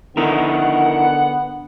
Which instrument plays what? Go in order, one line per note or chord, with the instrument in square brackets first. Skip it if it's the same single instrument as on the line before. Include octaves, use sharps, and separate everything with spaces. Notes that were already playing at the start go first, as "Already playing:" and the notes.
[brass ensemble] D3 B3 F#5 [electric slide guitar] D#4 E4 A#4